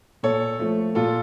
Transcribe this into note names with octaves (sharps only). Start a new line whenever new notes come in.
A#2 A4 C#5
F3 A3
A#2 F4 A4